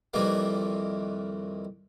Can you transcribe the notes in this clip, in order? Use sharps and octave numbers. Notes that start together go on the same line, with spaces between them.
F2 A#2 D#3 E3 G3 A#3